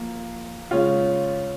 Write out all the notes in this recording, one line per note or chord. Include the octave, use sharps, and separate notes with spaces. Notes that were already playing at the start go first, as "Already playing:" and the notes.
Already playing: F3 A#3
C#3 G#3 C#4 F4